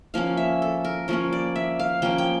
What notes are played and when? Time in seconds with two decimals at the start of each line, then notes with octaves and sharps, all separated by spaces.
0.14 F3 A#3 C#4 F5
0.37 E5
0.62 A4
0.85 A#4
1.08 F3 A#3 C#4 C#5
1.33 D5
1.56 E5
1.79 F5
2.02 F3 A#3 C#4 G5
2.18 G5